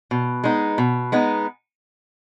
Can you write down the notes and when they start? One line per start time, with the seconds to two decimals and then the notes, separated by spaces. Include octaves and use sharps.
0.11 B2
0.44 G#3 B3 D#4
0.78 B2
1.12 G#3 B3 D#4